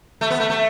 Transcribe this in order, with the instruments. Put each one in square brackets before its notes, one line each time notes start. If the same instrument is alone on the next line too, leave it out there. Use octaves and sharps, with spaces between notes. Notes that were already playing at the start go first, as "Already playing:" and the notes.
[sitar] A3
B3
A3
A3